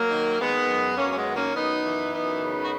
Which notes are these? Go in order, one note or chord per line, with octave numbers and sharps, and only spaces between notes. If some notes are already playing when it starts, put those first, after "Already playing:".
Already playing: F#3 A#3
D#3
D#3 G#3 B3
F#2
F#2 A#3 C#4
C#4
G#3 B3
D#3
A#3 C#4
F#2 B3 D#4
E3
F#2 B3 D#4
C#3
F#4